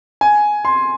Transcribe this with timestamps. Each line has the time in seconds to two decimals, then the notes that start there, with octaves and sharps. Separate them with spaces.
0.21 G#5
0.65 C6